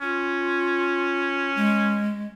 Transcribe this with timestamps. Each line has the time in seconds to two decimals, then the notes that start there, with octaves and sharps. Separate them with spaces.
0.01 C#4 F4
1.55 G#3